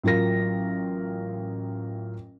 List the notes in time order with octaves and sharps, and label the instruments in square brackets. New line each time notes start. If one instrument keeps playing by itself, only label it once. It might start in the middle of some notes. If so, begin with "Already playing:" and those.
[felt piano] A1 F#3 F4 A#4 A#6